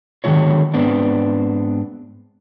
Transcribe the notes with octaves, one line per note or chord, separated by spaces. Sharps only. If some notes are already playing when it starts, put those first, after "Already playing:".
D3 D#3 F#3 G#3 F4 C#5
G#2 B3 C4 D4